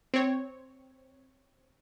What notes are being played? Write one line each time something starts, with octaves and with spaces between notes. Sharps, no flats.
C4 C#5